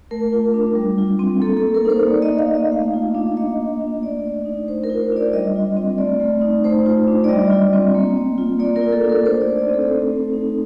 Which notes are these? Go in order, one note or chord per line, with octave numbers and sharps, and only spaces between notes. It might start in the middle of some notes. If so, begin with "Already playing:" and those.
A3 A#4
F4
D4
G3
F4
C4
A#3 A4
A4
A#3
A#4
D#4 C5
A#3 D5
D#5
A#3
F5
D#4 D#5
A3 F5
F4
D4
A#3 D#5
F4
D4
A3 D5
A3
D#4
A3 C5
A#4
F4
C5
D4 D5
G3 D#5
F4
C4
A3 D5
A3
D#4
A3 C5
F4
D4
D5
G3 D#5
F4
C4
A#3
A#3
F4
A#3 D5
A#4
F4
A4
D4
A#4
A3 C5
D5
D#4
D5
C4 A4
A3
A3
D#4